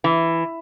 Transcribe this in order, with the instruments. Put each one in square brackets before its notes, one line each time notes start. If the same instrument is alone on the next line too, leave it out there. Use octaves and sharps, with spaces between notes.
[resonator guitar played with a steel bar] E3